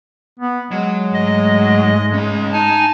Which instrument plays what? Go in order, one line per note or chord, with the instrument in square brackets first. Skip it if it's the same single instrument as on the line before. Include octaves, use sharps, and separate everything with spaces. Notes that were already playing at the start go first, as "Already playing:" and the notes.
[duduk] B3
[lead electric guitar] F#3 [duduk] G#3
[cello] G#2 A3 [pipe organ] D#5
[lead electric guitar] C#4 D#5
[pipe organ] D#4 G#5 [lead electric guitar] A5